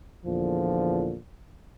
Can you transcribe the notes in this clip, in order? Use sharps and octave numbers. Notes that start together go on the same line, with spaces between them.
E2 A#2 D3 F3